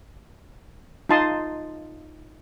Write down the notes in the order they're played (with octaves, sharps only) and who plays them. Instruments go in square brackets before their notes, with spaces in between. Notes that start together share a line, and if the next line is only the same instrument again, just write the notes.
[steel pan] D#4 F4 A5 C6 D#6